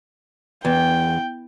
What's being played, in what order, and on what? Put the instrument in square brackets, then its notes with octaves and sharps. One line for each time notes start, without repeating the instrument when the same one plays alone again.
[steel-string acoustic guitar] E2 [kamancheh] G5